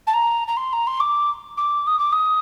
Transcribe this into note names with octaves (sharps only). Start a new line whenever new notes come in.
A5
A#5
A#5
C6
A#5
C6
D6
D6
D#6
D6
D#6